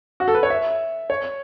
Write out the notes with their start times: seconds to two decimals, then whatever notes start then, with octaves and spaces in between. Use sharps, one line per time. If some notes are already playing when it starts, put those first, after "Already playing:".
0.20 F#4
0.28 A4
0.35 B4
0.43 C#5
0.50 E5
1.10 C#5